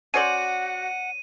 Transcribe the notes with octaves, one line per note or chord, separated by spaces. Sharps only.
C#4 F#4 C5 D5 F#5 D#7